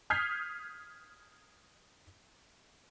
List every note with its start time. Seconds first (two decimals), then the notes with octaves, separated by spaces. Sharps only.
0.10 D#6 F6 G6 G#6 B6 C7